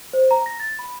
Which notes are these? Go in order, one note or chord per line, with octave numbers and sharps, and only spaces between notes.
C5
A#5
A#6
A6
B5